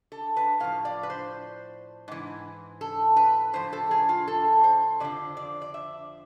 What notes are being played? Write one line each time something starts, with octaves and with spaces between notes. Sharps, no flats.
A4
B4
A2 F3 F5
D5
B4
C5
G#2 E3
A4
B4
A2 F3 C5
A4
G#4
F4
A4
C5
F2 D3 F3 D5
D5
D5
E5